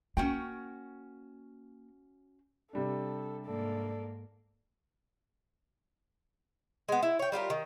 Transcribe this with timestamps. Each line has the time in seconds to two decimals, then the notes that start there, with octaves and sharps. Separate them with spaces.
0.17 A#3 C#4 F#4 G5
2.73 C3 G3 D4 A4
3.46 G#2 A#3 A4 D5
6.88 G#3 B3
7.03 E4
7.19 C#5 G5
7.32 G3 F4 G4 A#4
7.50 D#3